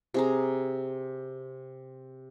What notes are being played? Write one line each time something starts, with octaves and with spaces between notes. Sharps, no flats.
C3 G#4 A#5